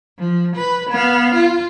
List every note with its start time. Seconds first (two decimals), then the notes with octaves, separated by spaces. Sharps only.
0.19 F3
0.56 B4
0.90 B3 F5
1.35 F4